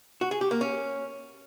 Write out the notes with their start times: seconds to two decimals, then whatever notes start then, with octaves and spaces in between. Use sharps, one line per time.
0.21 F#4
0.31 G#4
0.41 G4
0.51 A#3
0.61 C#4